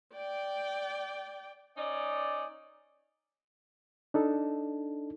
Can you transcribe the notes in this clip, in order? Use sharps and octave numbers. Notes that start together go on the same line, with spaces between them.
D5 G5
C#4 D#4 D5
D4 D#4 A4